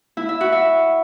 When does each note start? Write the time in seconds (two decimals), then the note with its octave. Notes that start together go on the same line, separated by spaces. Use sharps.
0.17 E4
0.29 E5
0.41 F#4
0.52 E5